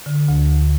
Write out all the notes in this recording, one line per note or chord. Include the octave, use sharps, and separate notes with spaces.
D3
D2
D2